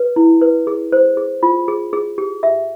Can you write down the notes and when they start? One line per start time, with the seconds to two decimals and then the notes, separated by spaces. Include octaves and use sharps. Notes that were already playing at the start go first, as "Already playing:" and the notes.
Already playing: B4
0.16 E4
0.42 B4
0.67 G#4
0.92 C5
1.17 G#4
1.43 F4
1.68 G#4
1.93 G#4
2.18 G4
2.43 E5